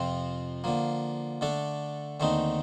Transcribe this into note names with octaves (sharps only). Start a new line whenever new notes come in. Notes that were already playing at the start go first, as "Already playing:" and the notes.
Already playing: F2 C3 F3 C4
D3 F3 A#3
D3 A3 D4 A4
D#2 D3 A3 C4 D#4